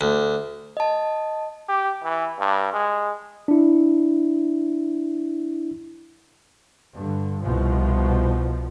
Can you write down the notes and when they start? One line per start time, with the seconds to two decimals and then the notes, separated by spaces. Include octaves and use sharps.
0.01 D2
0.77 D#5 A5
1.68 G4
2.04 E3
2.39 G2
2.73 G#3
3.48 D4 E4
6.94 G2 D3
7.41 C2 B2 F3